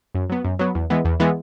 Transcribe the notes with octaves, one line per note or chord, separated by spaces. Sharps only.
F#2
F#3 B3
F#2
F#3 B3
E2
E3 G#3 B3
E2
E3 G#3 B3